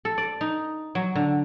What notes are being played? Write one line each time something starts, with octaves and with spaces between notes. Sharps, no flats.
A4
D5
D#4
F#3
D3